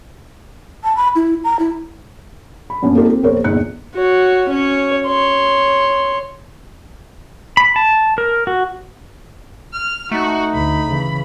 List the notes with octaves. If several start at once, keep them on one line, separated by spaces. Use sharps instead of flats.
A5
B5
E4
A#5
E4
B5
F#2 A#2 B3 C#4 D4
A#3 C4 D#4 F4 G4 A4
C4
A#1 E2 A#4 C5 C#5
G1 E2 A#2 D#4 F#6 C#7
F#4 C#5
C#4 C#5
C#5 C6
B5
A5
A#4
F#4
F6
A3 D#4 F#4
D2 B5
C#3 E3